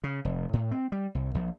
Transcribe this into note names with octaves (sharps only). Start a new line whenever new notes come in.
C#3
F1
A2
C4
G3
C2
A#1